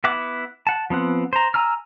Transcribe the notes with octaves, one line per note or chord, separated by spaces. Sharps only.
B3 E4 E5 F#5 D6
F#5 A5
F3 B3 C4 F#5
C5 A#5
G#5 A#5 E6 F6